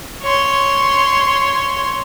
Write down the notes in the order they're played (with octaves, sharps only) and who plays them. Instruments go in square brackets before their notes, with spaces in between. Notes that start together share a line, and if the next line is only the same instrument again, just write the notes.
[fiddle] C#5 C6